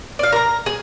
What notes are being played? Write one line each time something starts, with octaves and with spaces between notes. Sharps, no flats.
D5 F5
A#4 A#5
G#4